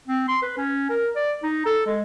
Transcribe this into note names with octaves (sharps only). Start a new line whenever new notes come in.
C4
C6
B4
C#4
A#4
D5
D#4
A4
G#3